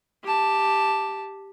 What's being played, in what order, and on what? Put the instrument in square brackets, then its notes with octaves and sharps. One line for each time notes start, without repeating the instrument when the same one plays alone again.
[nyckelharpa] G4 A5